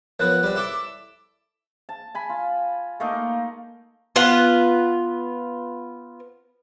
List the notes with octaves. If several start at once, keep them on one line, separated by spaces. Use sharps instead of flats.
F3 F#3 B3 A#4 B4 C#5 F#6
G3 C4
E4 A4 E5 D6
A5
G#5 B5
F4
A3 A#3 D#4
B3 F4 B4